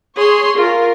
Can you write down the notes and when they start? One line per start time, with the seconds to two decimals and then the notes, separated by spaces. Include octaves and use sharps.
0.17 G#4 C#5 C6
0.56 F4 A#4